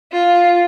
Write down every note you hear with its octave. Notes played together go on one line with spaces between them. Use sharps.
F4